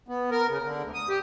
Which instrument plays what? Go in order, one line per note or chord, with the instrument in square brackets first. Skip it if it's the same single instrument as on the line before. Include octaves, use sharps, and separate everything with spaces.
[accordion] B3
A#4
C#3
D3
D2
D#6
G4